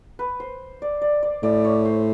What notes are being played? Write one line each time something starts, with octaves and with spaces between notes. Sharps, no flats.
B4
C5
D5
D5
D5
A2 D5
C#5
C5